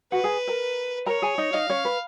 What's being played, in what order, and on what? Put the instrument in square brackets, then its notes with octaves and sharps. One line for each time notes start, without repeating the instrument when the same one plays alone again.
[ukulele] F#4 F#5 [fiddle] B4
[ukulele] G#4 G#5
A#4 A#5
[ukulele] A#4 A#5 [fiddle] C#5
[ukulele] G#4 G#5
D#4 D#5
[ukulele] D#4 D#5 [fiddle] F5
[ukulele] C#4 C#5
B4